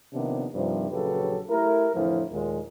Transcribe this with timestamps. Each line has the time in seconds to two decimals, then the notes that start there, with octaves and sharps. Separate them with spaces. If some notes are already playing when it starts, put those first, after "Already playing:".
0.14 C3 D#3 F3 A#3 B3 D4
0.55 G2 C3 D#3 F3
0.90 A#1 C#3 F#3 G4 A4 B4
1.50 A3 E4 G4 A#4
1.94 F2 A2 D3 E3 F3 E4
2.30 D#2 A#2 G#3